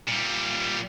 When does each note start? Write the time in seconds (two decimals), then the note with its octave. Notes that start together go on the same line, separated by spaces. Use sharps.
0.08 A#2 G3